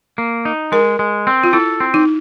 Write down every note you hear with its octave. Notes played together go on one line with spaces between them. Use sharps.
A#3
D#4
G#3 A#4
G#3
C4
F4
E4 A4
C4
D#4